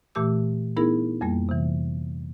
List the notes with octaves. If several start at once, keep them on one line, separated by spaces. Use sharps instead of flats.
A#2 E3 A3 G4 D6 E6
B3 D#4 E4 G#4 A#4
F2 G3 A#3
C3 E3